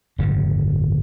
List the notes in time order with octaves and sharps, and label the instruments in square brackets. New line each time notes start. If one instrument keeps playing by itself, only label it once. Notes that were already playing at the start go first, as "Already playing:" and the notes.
[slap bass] D1 G1 F2 C#3